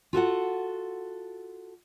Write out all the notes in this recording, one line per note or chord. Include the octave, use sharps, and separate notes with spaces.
F4 F#4 A4 F#5